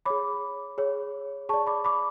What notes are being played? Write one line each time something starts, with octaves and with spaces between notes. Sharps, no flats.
G#4 C#5 B5 D6
G#4 C#5
G#4 D5 A5 C#6
B5 D6
B5 D6